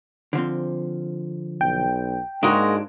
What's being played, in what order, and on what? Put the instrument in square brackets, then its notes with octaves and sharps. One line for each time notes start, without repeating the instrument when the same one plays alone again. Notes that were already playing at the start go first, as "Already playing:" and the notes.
[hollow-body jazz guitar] D3 F3 C4
[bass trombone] B1 [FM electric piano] G5
[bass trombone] G#2 [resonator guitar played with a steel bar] G#3 A#3 F#4 [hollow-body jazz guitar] D4